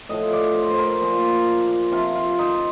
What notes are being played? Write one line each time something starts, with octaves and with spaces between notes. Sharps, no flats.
A2 F3 D#5
D5
C5
C5
A#4
A#2 F3
C3 F3 F4
F4
D#4